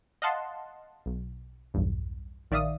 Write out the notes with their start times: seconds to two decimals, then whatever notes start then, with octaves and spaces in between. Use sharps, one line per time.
0.22 D#5 F5 F#5 A5 C6
1.06 B1
1.74 B1 E2 G2
2.51 A#1 D#3 D5 E5 F5 D#6